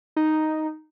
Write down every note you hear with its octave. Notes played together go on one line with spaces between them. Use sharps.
D#4